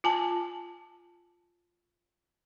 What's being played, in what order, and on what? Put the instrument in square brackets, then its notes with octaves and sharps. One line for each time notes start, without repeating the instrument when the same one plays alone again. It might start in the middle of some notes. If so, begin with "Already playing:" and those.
[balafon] F4 G#5 A5